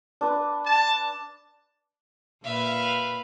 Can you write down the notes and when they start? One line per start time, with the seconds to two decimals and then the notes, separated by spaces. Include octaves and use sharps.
0.21 D4 B4
0.65 A5
2.44 A#2 B4 E5 F5